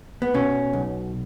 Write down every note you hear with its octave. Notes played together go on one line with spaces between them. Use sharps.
B3
B2 C#4
B1